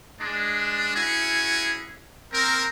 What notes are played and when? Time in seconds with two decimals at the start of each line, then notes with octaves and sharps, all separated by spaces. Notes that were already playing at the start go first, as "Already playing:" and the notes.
0.19 G#3 D4
0.95 C#4 E4 F#4 G#4
2.32 A#3 C4 A#4